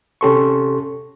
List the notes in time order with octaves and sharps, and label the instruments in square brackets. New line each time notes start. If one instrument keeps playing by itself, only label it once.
[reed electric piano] C3 C#4 G4 A4 C6 C#6